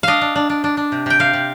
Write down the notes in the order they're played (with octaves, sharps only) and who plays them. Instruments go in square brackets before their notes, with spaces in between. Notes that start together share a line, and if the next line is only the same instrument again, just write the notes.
[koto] D4 D#5 F5
D4
D4
D4
D4
D4
C3
C3 G5
C3 F5
C3